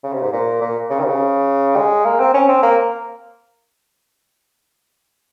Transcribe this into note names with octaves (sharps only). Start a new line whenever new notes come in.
C#3
C3
G#2
A#2
A#2
C#3
D#3
C3
C#3
G#3
A#3
C4
C#4
C4
A#3